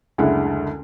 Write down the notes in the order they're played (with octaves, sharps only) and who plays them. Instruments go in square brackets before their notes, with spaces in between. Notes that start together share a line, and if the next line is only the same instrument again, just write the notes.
[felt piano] F#1 D2 D3 G#3 E4 F#5